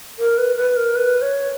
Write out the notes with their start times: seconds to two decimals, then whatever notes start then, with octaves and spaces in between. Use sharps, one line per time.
0.19 A#4
0.38 B4
0.57 B4
0.77 A#4
0.96 B4
1.22 C#5